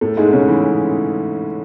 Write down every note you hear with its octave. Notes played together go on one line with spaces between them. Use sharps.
A2 A3
G#2 G#3
C#3 C#4
E3 E4